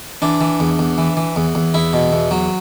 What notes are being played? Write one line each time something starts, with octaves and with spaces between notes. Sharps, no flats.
E3 D4
E3
E2
E2
E3
E3
E2
E2
E2 E4
B2
E2
F#3